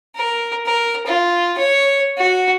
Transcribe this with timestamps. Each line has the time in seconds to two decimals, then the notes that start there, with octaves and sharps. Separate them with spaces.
0.16 A#4
0.66 A#4
1.06 F4
1.58 C#5
2.18 F#4